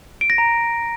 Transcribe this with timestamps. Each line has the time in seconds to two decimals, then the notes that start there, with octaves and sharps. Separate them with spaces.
0.21 D7
0.30 A#6
0.38 A#5